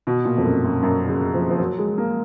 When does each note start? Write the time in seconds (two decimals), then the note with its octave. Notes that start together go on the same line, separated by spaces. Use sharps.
0.07 B2
0.25 A#2
0.37 F2
0.45 F#2
0.64 F#2
0.83 F#2
1.08 C#3
1.34 F3
1.50 F3
1.59 F#3
1.78 G#3
1.98 A#3